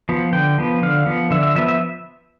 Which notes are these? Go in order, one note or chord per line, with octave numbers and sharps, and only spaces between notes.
F3 B3
D3 G5
F3 B3
D3 F5
F3 B3
D3 E5
E5
F3 B3 E5
E5